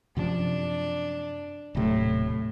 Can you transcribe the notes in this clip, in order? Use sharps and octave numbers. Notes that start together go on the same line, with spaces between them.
F#2 C3 F3 D4
D#1 A2 C3 F#3